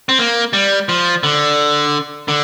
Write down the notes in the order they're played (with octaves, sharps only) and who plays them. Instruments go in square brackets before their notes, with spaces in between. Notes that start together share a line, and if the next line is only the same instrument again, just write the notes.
[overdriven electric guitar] C4
A#3
G3
F3
D3
D3